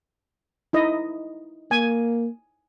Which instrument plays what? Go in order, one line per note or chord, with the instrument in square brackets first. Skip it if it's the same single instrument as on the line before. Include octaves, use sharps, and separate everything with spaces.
[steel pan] D#4 E4 D#5
[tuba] A#3 [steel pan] G#5